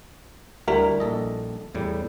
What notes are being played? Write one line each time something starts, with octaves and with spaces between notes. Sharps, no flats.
D2 G3 E4 A#4
A#1 A4 D#5
E2 A2 G3